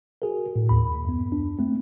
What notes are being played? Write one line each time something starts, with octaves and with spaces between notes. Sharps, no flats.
F#4 G#4 A#4
A2
D#2 B5
F#2 B3
D4
A3 C4